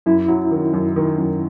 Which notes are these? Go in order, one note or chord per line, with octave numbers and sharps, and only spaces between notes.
F#2 E4
F#3
D#3
F#2
D#3
F#2